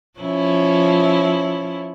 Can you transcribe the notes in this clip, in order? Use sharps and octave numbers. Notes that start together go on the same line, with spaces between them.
F3 C#4 E4